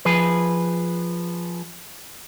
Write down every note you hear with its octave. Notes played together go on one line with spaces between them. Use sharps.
F3 G#4 B4